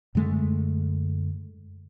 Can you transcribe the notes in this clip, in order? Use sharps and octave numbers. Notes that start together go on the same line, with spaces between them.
F#2 D3 G#3 A3